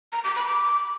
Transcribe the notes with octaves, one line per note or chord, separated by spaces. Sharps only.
A#5
D6
B5
D6